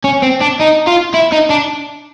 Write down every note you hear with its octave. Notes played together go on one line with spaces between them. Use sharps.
C#4
C4
D4
D#4
F4
E4
D#4
D4